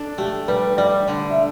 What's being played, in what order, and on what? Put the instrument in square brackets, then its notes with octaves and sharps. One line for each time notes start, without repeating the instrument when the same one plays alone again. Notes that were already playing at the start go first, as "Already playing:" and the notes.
Already playing: [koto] D4 A4
[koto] A3 [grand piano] G4
[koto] G3 [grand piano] B4
[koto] G3 [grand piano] D5
[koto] D3
[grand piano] E5